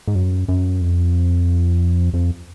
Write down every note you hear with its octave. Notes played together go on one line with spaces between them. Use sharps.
G#2
F#2
F#2
F2
F2